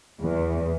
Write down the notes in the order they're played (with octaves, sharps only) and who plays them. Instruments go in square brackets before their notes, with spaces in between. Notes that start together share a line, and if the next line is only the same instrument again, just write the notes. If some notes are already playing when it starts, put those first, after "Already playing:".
[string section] E2